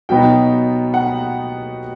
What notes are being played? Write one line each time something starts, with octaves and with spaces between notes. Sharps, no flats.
B2 F#3 B3 D#4 G5
F#5